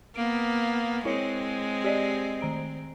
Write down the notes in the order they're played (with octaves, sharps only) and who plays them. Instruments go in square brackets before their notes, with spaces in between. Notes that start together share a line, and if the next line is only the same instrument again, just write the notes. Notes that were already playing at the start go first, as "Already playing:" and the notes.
[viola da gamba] A#3 B3 [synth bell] D7
[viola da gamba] G#3 C4 [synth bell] E4 C#5 C#7
[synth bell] G4 D5 D#5
D#3 A#5 D7